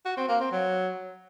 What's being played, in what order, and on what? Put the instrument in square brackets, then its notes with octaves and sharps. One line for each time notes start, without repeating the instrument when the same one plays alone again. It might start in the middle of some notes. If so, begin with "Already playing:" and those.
[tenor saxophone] F#4
C4
A#3
C4
F#3